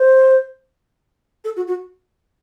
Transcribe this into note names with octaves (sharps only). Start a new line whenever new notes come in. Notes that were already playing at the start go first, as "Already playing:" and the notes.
Already playing: C5
A4
F#4
F#4